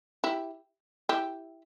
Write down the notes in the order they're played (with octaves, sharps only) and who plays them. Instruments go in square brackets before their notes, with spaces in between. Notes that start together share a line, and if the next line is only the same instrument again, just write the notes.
[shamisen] E4 G4
E4 G4